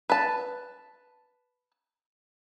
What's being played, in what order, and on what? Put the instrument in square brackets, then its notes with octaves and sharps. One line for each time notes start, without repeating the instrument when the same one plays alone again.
[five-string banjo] B4 A5